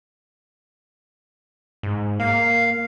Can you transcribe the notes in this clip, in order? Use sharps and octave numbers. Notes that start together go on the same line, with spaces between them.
G#2
A#3 F5